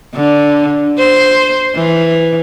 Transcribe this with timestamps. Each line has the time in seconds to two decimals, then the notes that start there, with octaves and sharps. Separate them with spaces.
0.15 D3
0.98 C5
1.76 E3